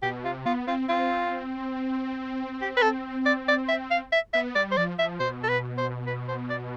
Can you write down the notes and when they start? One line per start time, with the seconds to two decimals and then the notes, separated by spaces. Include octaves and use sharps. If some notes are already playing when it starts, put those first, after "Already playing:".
0.02 B2 G4
0.24 C3 F4
0.46 B3 F4
0.67 C4 F4
0.89 C4 F4
2.62 G4
2.77 B4
2.82 A4
3.26 D5
3.48 D5
3.68 E5
3.91 F5
4.12 E5
4.33 B3 E5
4.55 G3 D5
4.71 C5
4.77 F3 D5
4.99 F3 E5
5.20 B2 C5
5.43 A4
5.49 B4
5.77 C5
6.07 B4
6.28 C5
6.50 D5